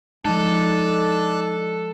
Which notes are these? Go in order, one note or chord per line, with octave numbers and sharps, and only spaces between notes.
F3 G#3 D4 D#4 A4 A5 F#6